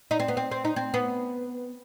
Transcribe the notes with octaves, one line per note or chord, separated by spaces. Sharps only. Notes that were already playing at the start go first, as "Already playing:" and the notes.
D#4
C4
B3
C4
C4
D#4
C4
B3